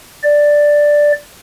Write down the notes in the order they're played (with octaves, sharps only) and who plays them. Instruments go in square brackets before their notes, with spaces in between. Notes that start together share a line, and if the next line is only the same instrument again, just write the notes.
[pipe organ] D5